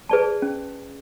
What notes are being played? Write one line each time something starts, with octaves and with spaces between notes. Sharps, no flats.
G#4 B4 D5 A5
C#4